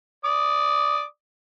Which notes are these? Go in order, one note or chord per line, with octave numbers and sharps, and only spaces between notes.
D5 D6 D#6